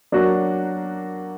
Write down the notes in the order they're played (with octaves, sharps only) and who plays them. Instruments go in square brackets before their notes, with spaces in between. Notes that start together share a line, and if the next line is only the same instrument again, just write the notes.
[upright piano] F#3 A#3 D4 F#4